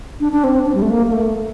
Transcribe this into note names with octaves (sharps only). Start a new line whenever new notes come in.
D4
D4
C4
D4
G3
A3
A#3
A#3
A3